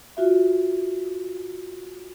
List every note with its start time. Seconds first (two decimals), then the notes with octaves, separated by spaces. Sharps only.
0.17 F4 F#4 E5